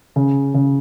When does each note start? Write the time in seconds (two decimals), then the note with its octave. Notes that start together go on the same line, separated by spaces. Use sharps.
0.16 C#3
0.54 C#3